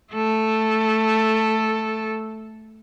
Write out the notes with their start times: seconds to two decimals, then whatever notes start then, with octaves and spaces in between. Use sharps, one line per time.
0.13 A3 A4